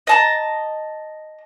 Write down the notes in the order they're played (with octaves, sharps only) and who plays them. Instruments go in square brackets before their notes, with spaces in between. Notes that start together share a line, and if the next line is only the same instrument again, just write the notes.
[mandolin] D#5 A5 A#5